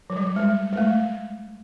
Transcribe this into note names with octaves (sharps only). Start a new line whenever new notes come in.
F#3
G3
G#3
G#3
A3